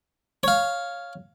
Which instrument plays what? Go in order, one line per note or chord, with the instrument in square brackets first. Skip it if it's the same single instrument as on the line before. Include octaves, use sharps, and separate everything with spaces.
[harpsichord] C#5 F5